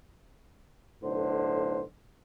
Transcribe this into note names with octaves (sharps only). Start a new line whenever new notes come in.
B1 A2 D3 C5